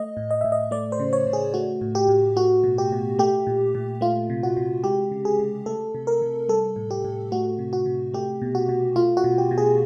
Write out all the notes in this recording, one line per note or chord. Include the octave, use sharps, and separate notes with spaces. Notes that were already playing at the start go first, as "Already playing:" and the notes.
Already playing: A3 D#5
A2
D#5
A2 E5
D#5
A3 D5
C5
C#3
C#5
C#3
G#4
A3 F#4
A2
G4
A2
A3 F#4
B2
G4
B2
A3 G4
A#2
A#2
A3 F4
C3
F#4
C3
G#3 G4
C#3
G#4
C#3
A3 A4
C3
A#4
C3
G3 A4
A2
G4
A2
A3 F#4
C3
F#4
C3
A3 G4
B2
F#4
B2
A3 F4
F#4
B2
G4
B2
G#4